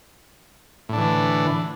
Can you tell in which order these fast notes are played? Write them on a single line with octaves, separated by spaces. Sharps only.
A2 D4 E3 D3